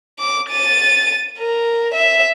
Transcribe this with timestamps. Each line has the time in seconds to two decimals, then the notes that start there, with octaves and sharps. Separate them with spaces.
0.19 D6
0.50 A6 D#7
1.39 A#4
1.94 E5